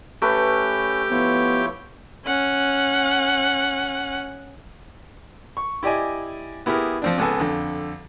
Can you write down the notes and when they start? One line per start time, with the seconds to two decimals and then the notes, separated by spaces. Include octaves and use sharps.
0.22 A3 C#4 G4 B4
1.11 F3 B3 E4 C#5
2.26 C#4 F#5
5.57 C#6
5.83 E4 G4 D5 D#5 G#5
6.66 B3 E4 G4 G#4 A#4
7.02 F3 C4 D4
7.18 C#2 G#3 B3 A4 G#5
7.40 F2 D3